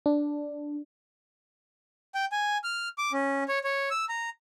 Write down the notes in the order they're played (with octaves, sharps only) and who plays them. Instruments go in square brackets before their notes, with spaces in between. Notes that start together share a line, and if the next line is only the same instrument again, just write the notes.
[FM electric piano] D4
[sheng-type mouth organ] G5
G#5
F6
D6
C#4
C#5
C#5
E6
A#5